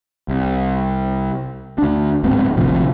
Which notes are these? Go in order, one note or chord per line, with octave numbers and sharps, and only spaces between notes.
C2
D2 D4
D1 G#2 B3 C4
G#1 D2 C3 F3